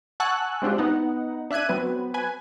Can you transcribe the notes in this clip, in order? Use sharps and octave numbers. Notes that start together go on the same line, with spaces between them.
F#5 G#5 A5 C#6 E6 F#6
G#3 C4 D4 F4 G4
B3 D#4 F#5
D4 E5 F#6 G#6 D#7
F#3 B3 C4 B4
B4 G#5